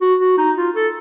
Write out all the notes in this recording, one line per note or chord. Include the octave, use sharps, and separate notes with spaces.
F#4
F#4
D#4
F4
A4